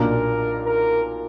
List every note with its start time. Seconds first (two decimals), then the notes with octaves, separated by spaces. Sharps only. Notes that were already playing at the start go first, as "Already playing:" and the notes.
Already playing: B1 A#2 A#3 D4 A#4
0.66 A#4